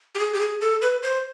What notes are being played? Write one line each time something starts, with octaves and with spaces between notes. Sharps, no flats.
G4
G#4
G4
G#4
A4
B4
C5